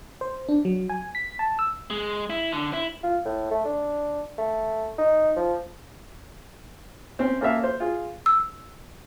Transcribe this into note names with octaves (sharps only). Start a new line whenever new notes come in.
C5
D4
F#3
G#5
B6
A5
E6
G#3
E4
D3
E4
F4
A2
A3
D4
A3
D#4
F3
C4 C#4
A#3 C#4 A4 A#4 E5 F5
C5
F4 G#4
E6